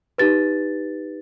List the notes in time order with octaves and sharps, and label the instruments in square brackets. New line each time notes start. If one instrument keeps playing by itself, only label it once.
[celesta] D#4 G4 B4 A6